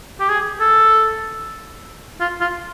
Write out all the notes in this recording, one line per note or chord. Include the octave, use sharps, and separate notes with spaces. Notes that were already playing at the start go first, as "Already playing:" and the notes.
G4
G#4
A4
F4
F4